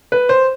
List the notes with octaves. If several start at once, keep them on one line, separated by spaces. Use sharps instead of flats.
B4
C5